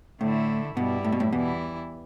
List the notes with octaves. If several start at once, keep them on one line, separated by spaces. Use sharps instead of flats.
A2 D3 A3 E4
G2 B2 G3 E4
A2
B2
A2
E2 B2 E3 G3 E4